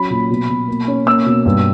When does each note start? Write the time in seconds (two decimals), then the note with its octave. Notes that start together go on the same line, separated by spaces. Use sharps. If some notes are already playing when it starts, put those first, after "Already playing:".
Already playing: F#3 C#4 B5
0.10 A#2
0.30 B2
0.49 B2
0.68 A#3
0.88 C#4
1.06 A#3 E6
1.26 B2
1.45 G2